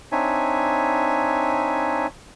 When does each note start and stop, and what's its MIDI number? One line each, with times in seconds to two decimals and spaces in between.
0.12 2.07 60
0.12 2.07 62
0.12 2.07 63
0.12 2.07 73
0.12 2.07 76
0.12 2.07 80